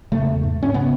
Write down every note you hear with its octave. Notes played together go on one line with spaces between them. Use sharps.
E2 C#3 A3
G#2
C#4
C#3 B3